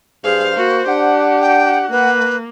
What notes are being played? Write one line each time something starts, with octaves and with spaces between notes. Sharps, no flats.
G2 G#4 C5 F5
A#3 F#4
D4 G4 F#5
G5
A#3 B4